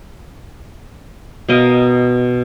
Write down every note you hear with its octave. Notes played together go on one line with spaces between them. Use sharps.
B2 A#4 D#5 F5